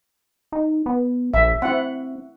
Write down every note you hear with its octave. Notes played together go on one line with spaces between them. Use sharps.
D#4
B3
A#1 E5
C4 E4 F#5